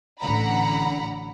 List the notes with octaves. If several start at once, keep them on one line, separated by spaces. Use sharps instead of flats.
A1 D3 F#5 A#5 B5